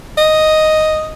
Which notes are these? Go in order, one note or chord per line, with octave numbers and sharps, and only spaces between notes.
D#5